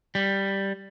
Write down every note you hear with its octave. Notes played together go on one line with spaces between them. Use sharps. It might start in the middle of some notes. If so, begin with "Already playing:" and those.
G3